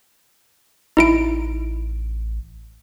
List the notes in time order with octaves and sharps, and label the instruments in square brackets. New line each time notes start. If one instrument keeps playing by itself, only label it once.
[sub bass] A1 [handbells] D#4 E4 D7